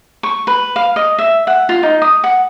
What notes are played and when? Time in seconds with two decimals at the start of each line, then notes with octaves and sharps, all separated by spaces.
0.23 C#6
0.47 B4
0.76 F5
0.96 D#5
1.19 E5
1.47 F#5
1.69 F4
1.83 D#4
2.02 D#6
2.24 F#5